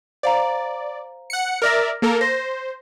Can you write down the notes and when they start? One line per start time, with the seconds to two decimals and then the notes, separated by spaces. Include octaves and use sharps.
0.23 C5 D5 F5 A#5
1.30 F#5 C#7
1.62 A#4 D5 E5 F6 A#6
2.02 A#3 A4 A#4
2.21 C5 A#6